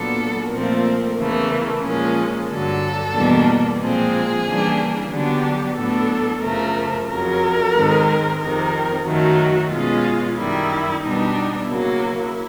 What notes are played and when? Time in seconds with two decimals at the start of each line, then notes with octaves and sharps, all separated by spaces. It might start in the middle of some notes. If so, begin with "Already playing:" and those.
Already playing: A#2 F#3 B3 D4 A4
0.51 A#2 F3 A3 C4 A#4
1.17 E2 C#3 E3 A3
1.83 A#2 F3 G#3 C#4
2.49 G2 D3 F#3 A4
3.14 E2 B2 G3 A#3 D4
3.80 A#2 F3 G#3 C4 G#4
4.46 C#3 E3 G3 A#3 D4
5.12 D3 F#3 B3 D4 G4
5.77 A2 F#3 B3 D4 A4
6.43 F#2 C#3 F3 A3 A#4
7.09 F2 C#3 F#3 A#4
7.75 G#2 D#3 G#3 C4
8.41 F2 C3 D#3 A#4
9.06 F#2 D#3 F#3 A3 F#4
9.72 B2 G#3 C#4 F4
10.38 F#2 D#3 G3 E4
11.04 B2 G3 B3 D4 D#4
11.69 C#3 F#3 A#3 E4